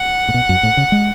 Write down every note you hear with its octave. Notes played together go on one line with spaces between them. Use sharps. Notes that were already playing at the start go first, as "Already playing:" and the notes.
Already playing: F#5
A2
B2
F#2
A2
C#3
G#3